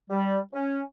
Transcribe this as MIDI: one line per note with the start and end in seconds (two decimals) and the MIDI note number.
0.10 0.39 55
0.53 0.81 61